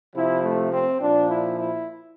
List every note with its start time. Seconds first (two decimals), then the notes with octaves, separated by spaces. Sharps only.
0.15 C3 F3 E4
0.44 A3
0.73 C4
1.01 A#2 F3 D4
1.30 E4
1.59 E4